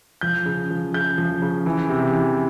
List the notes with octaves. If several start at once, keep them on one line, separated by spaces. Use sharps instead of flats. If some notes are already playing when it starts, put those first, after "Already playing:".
F3 G6
C#3
F3
C#3 G6
F3
C#3
E3
C3
E3